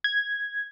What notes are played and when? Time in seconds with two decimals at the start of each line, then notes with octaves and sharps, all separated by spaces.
0.04 G#6